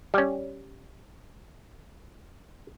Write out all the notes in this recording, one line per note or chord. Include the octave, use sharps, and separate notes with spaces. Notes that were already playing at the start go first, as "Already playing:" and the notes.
G3 C#4